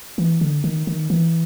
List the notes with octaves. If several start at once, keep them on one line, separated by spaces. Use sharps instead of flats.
E3
D3
D#3
D#3
E3